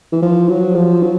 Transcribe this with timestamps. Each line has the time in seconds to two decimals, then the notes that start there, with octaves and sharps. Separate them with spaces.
0.12 E3
0.22 F3
0.49 F#3
0.75 F3
1.03 F#3